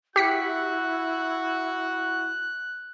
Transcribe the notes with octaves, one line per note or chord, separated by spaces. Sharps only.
E4 F#4 G4 F#6 B6 C#7